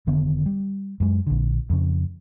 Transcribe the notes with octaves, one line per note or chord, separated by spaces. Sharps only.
F1 D3 D#3 B3
G3
F#2 G#3
A#1 D3
F2 C#3